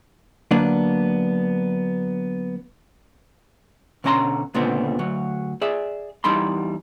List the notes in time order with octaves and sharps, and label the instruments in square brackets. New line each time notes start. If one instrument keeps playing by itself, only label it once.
[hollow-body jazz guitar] D3 F#3 A#3 B3 D4
B2 D3 C#4 G5 A#5 C6
C#2 A#2 D3 B3 C4
D2 F#3
G#4 D5 E5
E2 G3 D#4 E4 B5 C6